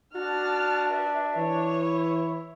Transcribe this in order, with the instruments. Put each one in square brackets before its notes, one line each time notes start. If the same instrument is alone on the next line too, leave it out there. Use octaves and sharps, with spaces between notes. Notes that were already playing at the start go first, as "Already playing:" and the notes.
[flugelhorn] D4 [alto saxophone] F#4 [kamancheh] A5 F6
[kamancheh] B4 E5
[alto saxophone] E3 [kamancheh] C#5
[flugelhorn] E4